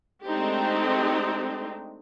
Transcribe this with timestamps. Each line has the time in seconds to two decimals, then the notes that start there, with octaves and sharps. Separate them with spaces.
0.24 G#3 A3 C4 D4 D#4 G4